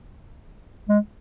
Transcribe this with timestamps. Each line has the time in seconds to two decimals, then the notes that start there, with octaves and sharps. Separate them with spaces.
0.88 G#3